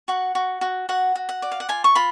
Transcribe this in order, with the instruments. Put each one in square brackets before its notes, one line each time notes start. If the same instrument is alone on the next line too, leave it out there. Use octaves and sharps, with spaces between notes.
[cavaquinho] F#4 F#5
F#4
F#4
F#4 F#5
F#4
F#5
D5
F5
F#5
F4 G#5
C#6
F4 B5